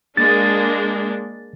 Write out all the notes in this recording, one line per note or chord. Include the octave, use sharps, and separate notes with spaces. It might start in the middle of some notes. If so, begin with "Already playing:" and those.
G#3 A#3 D4 A6